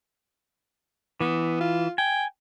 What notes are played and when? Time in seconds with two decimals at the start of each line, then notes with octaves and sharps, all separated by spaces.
1.21 E3 B3
1.61 F4
1.98 G5 G#5